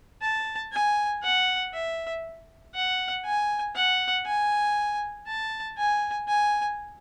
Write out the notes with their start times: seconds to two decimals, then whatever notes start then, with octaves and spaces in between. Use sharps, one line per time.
0.22 A5
0.72 G#5
1.23 F#5
1.73 E5
2.74 F#5
3.25 G#5
3.75 F#5
4.26 G#5
5.27 A5
5.78 G#5
6.28 G#5